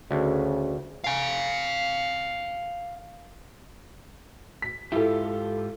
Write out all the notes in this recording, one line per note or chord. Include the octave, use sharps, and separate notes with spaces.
D2 C#3
F5 G#5
B6
G#2 E4 F4 G4 A4